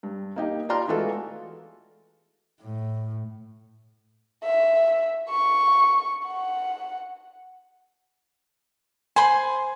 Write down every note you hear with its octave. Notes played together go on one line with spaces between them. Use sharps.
G2
A#3 D#4 G4
F4 G4 D5 A#5 C6 F6
E3 G#3 A3 F4 F#4 A4
A2
E5
C#6
F#5
C5 G#5 B5 C6